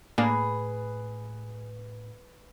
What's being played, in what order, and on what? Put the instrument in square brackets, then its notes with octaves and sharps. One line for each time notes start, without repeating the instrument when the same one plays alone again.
[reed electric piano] A2 [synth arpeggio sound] A#3 D4 [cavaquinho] G#4 [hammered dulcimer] B4